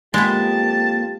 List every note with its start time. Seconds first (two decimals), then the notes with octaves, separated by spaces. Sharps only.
0.14 F2 G#3 A#3 B3 F4 G4 A5